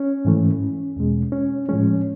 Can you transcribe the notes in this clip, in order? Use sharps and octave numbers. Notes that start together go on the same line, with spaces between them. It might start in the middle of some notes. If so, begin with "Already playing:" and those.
Already playing: C#4
G#2 E3 A3
E2 B2 G#3
C#4
A2 F3 G#3 C#4